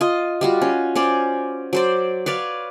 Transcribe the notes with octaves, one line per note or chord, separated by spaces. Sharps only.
F4 D#5
G3 F4 F#4
C#4
C#4 C5 D5
F#3 C5 D5
B4 C#5 D5 F5